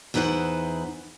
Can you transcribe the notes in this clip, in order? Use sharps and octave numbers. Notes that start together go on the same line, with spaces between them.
E2 D#4 E4 B4 C5 F#5